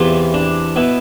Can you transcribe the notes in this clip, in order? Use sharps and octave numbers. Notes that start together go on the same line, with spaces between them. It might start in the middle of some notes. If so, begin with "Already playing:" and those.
Already playing: E2 C3 E3 F4
D4
B2 B3 E4